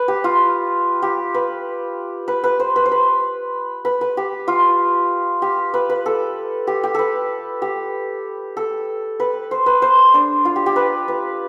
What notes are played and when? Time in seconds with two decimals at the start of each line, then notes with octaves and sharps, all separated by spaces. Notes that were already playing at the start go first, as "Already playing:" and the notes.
Already playing: B4
0.08 G4
0.24 F4
1.02 G4
1.34 B4
2.28 B4
2.44 B4
2.60 C5
2.76 B4
2.85 C5
2.91 B4
3.85 B4
4.01 B4
4.17 G4
4.48 F4
5.42 G4
5.74 B4
5.90 B4
6.06 A4
6.67 G4
6.84 G4
6.95 A4 B4
7.62 G4
8.57 A4
9.20 B4
9.51 C5
9.66 B4
9.82 C5
10.14 D4
10.45 F4
10.56 G4
10.66 G4
10.76 B4
11.08 B4